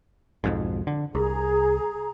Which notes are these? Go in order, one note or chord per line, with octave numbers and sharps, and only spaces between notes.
B1 F2 G#2
D3
C2 G#4 A#5